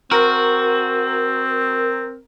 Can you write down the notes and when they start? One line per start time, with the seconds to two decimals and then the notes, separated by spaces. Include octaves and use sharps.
0.11 C4 F#4 A#4